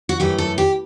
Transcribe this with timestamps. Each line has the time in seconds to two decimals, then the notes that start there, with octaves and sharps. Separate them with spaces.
0.09 F#4
0.20 F#2 E3 A3 G4
0.38 A4
0.58 G4